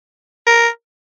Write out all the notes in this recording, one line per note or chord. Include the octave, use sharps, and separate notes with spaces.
A#4